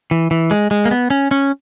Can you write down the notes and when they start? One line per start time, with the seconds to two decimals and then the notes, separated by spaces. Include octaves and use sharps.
0.11 E3
0.31 E3
0.51 G#3
0.71 G#3
0.85 A#3
0.91 B3
1.10 C#4
1.31 C#4